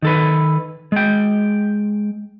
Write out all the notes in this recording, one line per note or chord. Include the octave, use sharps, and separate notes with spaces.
D#3 A4 B4
G#3 G5